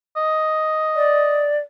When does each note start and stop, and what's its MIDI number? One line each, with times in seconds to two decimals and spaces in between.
0.16 1.50 75
0.96 1.58 74